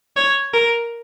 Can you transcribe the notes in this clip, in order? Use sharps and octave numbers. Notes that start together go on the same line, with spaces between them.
C#5
A#4